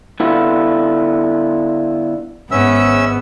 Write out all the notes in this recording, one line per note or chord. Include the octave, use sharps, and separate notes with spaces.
D3 B3 E4 F4
G#1 G#2 B3 C#4 E5 E6